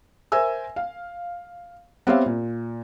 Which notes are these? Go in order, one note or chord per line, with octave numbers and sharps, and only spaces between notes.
A#4 C5 E5 G#5 E6
F5
B3 C4 G4 C#5 E5 F5
A#2